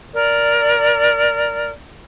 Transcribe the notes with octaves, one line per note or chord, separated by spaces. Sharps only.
A#4 D5